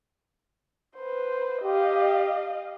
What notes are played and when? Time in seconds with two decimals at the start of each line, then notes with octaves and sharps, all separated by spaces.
0.97 B4 C5
1.63 G4 D#5 F5